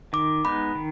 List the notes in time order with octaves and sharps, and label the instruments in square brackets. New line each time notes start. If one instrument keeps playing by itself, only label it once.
[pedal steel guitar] D#3 [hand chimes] D6
[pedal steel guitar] G#3 B3 D#4 [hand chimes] B5
[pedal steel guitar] D#3